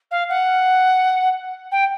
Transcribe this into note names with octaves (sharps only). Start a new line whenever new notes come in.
F5
F#5
G5